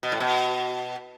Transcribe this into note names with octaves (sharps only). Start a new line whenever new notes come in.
B2
A2
B2